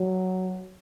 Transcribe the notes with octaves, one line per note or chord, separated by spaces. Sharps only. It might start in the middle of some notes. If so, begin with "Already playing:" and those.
Already playing: F#3